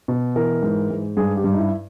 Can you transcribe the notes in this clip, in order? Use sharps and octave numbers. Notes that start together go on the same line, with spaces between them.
B2
E3 A#4
G#2
G#2
G2 G#4
G4
G2
D#4
E4